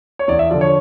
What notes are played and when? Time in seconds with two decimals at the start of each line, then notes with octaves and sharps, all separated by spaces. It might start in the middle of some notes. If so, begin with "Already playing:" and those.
0.19 C#5
0.28 E2 D5
0.39 E5
0.51 D3 F3 D5
0.61 C#5